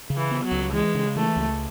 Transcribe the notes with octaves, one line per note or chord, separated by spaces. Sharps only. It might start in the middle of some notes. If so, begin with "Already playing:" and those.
C#3
E3
B3
F#3
C#2
E3 G#3
C#3
E3 A3
C#2